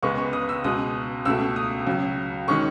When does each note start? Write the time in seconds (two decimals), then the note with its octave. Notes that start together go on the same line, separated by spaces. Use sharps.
0.03 C#2 C#3 G#3 B3 C#6
0.18 C#6
0.33 D#6
0.49 E6
0.64 C#2 B2 G#3 D#6
1.25 C#2 B2 A3 E6
1.56 D#6
1.87 C#2 C#3 F#3
2.48 D#3 G#3 C#4 C#6